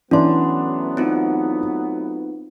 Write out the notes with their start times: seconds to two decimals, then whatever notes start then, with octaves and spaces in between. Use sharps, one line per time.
0.11 E3 F#3 A3 B3 C#4 D4 C6
0.97 C4 D#4 F4